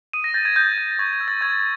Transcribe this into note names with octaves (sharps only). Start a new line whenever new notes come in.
D#6 D#7
A#6
G6 A6
G#6
D#6 G6
G6
C#6 G#6
G#6
E6 G6
A6
C#6 G#6